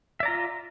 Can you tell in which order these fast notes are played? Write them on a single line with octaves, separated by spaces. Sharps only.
E5 D5 A#5 F4